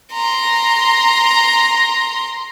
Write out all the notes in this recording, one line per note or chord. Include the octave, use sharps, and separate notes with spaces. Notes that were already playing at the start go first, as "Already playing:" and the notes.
A#5 C6